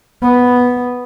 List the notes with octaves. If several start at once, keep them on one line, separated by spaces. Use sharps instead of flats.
B3